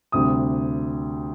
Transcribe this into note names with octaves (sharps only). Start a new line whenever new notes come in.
D2 C3 G3 D#6